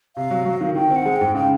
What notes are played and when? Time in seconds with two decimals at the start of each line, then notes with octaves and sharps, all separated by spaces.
0.16 C3 F5
0.30 F#3
0.45 F#3
0.61 D#3
0.76 D#3 G5
0.91 C4
0.96 F#5
1.06 G#3
1.16 G#2 G5
1.35 C#3 G5